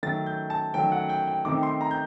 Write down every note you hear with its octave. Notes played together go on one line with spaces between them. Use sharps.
D#3 F#3 A3 A6
G6
A5
D#3 F#3 A3 G5
F#5
G5
G5
D#3 A3 C4 D#4 D6
C6
A#5
G6